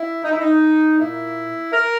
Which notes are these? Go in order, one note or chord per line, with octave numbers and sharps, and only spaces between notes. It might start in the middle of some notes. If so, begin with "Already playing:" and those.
Already playing: E4
D#4
E4
D#4
A#2 A#3 E4
A#4